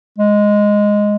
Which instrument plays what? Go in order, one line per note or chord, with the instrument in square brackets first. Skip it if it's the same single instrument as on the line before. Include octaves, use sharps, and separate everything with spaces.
[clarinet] G#3